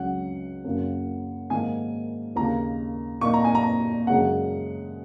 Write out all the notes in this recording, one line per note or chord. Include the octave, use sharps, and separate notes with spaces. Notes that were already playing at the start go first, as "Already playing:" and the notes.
Already playing: C#2 C#3 F#3 C#4 F#5
F#2 C#3 A#3 C#4
G#2 D#3 A#3 G#5
D#2 C#3 A#3 A#5
A#2 A#3 D#4 C#6
A#5
G#5
A#5
F#2 C#3 G#3 C#4 F#5